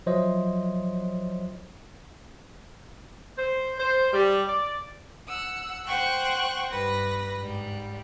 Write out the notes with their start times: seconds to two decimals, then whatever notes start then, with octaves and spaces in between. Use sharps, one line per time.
0.06 F3 F#3 C5 C#5 D#5 E5
3.37 C5
3.79 C5
4.12 G3
4.47 D5
5.28 F#5 E6
5.86 C5 F#5 G5 C#6 F#6
6.71 G2 B4 A#6
7.43 G#2 G3